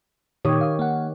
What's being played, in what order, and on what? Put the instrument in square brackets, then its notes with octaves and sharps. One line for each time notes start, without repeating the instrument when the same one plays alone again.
[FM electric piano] A#2 D#6 [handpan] D#3 G4 C#5
[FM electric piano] F5 D#6
A#3 F#5